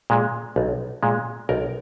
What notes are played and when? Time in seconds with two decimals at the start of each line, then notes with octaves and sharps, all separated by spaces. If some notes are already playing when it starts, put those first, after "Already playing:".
0.10 A#2 G#3
0.56 B1
1.03 A#2 G#3
1.49 B1 A#4